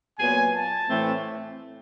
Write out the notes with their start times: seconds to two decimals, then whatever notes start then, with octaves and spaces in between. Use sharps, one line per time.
0.18 A#2 F#3 B3 G#5
0.54 A5
0.88 A2 E3 A3 C4